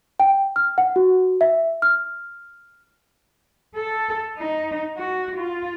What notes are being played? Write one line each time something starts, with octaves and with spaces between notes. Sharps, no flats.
G5
F6
F#5
F#4
E5
F6
A4
D#4
F#4
F4